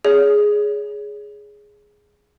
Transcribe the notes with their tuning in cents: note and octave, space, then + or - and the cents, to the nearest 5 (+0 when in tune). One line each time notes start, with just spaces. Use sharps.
G#4 +0 C#5 +30